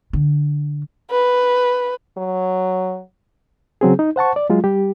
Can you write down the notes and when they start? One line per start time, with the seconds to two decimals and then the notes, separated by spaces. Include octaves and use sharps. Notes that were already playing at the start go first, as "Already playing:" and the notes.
0.13 D3
1.11 B4
2.18 F#3
3.81 C#3 F#3 C4 G#4
3.99 D#4
4.16 C5 F#5 A5 C#6
4.36 D5
4.50 F#3 G#3 F4
4.64 G3 G4